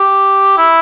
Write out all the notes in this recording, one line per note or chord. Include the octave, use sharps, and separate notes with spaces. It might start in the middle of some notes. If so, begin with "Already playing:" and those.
Already playing: G4
E4